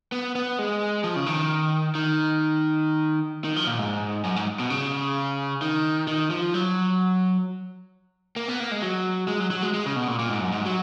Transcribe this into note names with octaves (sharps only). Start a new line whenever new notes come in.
B3
B3
G#3
F3
C#3
D#3
D#3
D#3
F3
A#2
G#2
F#2
G#2
B2
C#3
D#3
D#3
F3
F#3
A#3
B3
A#3
G#3
F#3
G#3
F#3
F#3
G#3
G#3
C#3
B2
A#2
A#2
G#2
F#2
G#2
F#3